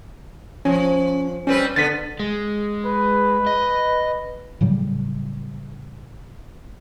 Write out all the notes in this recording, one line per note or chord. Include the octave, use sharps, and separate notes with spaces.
F3 C#4
G3 C4 C#4 B4
D3 B3 A6 B6
G#3
B4
D#5
A2 C#3 F#3 G3